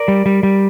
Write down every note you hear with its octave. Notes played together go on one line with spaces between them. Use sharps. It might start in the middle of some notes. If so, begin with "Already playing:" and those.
Already playing: A#4 D5
G3
G3
G3